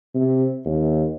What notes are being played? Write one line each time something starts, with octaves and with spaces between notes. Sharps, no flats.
C3
D#2